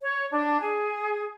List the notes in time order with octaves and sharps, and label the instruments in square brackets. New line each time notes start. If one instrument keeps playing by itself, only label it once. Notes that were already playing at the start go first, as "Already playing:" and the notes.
[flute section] C#5
D4
G#4